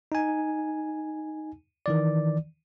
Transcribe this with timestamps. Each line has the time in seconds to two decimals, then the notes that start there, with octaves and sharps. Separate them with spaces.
0.12 D#4 G#5
1.86 D#3 E3 D5